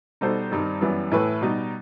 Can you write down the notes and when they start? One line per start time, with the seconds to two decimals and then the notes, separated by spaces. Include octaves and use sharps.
0.21 B2 G3 D#4 A4 C5
0.51 G2 D#3 G3 C4 D#4
0.81 F#2 E3 G3 B3
1.12 A2 E3 A3 E4 B4
1.41 B2 G3 D#4